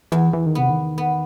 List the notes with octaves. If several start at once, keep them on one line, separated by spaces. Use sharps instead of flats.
E2 E3
E3
D#3
C3 B3
D#3
B3